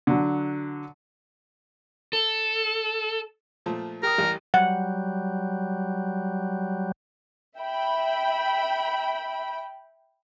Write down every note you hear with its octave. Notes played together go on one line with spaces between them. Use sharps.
D3 F#3
A4
A#2 F3 A3
G4 A#4 D#6
A1 G3
F#3 G3 F#5
E5 G5 B5